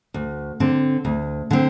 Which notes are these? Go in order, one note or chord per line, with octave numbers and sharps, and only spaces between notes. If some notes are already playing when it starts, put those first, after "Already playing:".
D2
D3 C4
D2
D3 C4